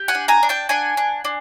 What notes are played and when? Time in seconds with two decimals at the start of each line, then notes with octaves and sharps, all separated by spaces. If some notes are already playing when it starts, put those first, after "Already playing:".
Already playing: G4
0.08 F#5 G#5
0.15 D4
0.28 G#5 A#5
0.43 D4
0.49 G5 A5
0.69 D4 F#5 G#5
0.97 D4
1.25 D4